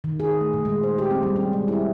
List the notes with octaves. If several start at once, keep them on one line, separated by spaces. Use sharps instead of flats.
D#3
G#4
A3
A#2
G#3
C5
G4
C4
G3
C#4
G#3
E4